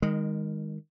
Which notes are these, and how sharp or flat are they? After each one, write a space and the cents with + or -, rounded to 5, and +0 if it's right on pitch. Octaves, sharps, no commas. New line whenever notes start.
D#3 +0 G#3 -25